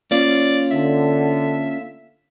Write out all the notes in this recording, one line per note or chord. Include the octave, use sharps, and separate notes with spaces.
A#3 C#4 F4 D5
D3 E5